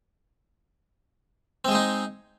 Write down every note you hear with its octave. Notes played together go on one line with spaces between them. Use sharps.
G#3 C4 D#4 G#4